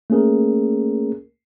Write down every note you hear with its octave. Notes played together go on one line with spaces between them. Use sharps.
A3 A#3 C#4 G#4 A#4